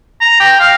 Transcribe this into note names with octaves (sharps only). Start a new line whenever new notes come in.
A#5
G5
F5